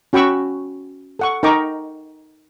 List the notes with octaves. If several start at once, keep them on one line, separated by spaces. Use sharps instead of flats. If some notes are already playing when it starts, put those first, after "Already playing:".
C#4 F#4 G5 B5 C#6 E6
A4 F#5 C#6
D#4 A#4 G5 A#5 C#6 D6